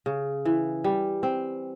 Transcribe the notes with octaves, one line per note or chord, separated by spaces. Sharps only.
C#3
E3
G3
C4